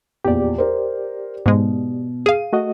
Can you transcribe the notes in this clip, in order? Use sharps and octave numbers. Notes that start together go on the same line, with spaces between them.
A#1 E2 G4 D5
A#4 C5
G#2 B2 G#3
G#4 F5 D#7
A3 F#4 D#5